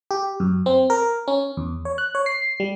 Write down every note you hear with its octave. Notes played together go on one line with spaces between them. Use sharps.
G4
F#2
C4
A#4
C#4
E2
C#5
F#6
C#5
C7
G3